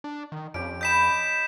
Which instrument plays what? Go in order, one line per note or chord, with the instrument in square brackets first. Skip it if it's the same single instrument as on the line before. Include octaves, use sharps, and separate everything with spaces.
[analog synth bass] D4
D#3
[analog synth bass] F2 [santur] C#4 G4 [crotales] D7
[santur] D#5 G5 B5 [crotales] G6 B6 E7